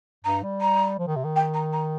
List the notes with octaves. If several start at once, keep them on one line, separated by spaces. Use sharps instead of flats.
G2 A#5
G3
A#5
F3
D#3
C3
D#3
G5
A#5
A#5